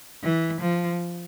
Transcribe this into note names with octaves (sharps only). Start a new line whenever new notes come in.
E3
F3